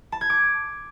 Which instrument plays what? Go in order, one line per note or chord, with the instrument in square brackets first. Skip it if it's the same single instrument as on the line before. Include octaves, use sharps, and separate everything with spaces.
[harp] A5
G#6
D6